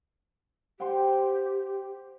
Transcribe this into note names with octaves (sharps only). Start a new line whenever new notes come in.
G4 C5 F#5 G5